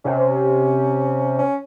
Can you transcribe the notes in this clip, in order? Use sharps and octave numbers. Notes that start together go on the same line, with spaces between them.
C3 C#4
C#4